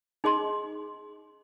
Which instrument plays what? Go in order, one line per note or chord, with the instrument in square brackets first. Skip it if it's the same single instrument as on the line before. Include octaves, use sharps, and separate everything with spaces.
[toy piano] D#4 G#4 D#5 C6